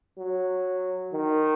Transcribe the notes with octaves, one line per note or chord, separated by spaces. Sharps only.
F#3
D#3